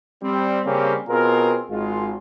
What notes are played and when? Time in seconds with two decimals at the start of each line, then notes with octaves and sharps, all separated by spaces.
0.23 G3 C4
0.65 C#3 G3 A#3 C4 C#4 G4
1.08 B2 C4 F4 G#4 A#4
1.70 G#1 G#3 F4